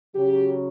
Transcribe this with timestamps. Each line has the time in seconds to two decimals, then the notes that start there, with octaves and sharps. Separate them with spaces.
0.14 C#3 F#3 G4